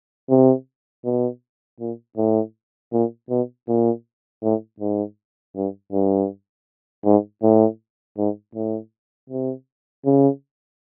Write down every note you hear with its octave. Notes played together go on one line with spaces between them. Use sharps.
C3
B2
A#2
A2
A#2
B2
A#2
A2
G#2
G2
G2
G#2
A2
G#2
A2
C3
C#3